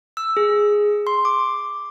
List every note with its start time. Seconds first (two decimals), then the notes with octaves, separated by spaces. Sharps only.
0.17 E6
0.37 G#4
1.07 C6
1.25 D6